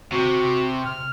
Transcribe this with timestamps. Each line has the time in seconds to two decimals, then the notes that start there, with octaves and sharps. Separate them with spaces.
0.12 C3 F#4
0.85 F6